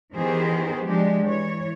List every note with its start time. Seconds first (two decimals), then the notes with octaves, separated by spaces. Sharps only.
0.14 D#3 E3 B3 G4 G#4 C5
0.85 F3 G#3 D4 G4
1.24 E3 C#5